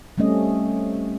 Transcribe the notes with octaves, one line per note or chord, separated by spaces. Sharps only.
G3 A3 C4 C#4 D#5